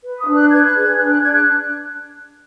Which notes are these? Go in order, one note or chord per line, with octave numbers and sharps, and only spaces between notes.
B4
D#6
D4
F#6
B4 G#6
F#6
G#4 G#6
D4 F#6
F#6
D4 G#6
F#6